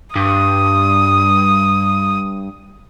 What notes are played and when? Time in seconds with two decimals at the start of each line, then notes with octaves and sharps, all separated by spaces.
0.16 G2 D#6